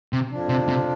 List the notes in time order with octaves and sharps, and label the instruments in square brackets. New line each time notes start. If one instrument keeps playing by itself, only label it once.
[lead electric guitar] C3
[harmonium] F2 F3 D4
[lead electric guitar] C3
C3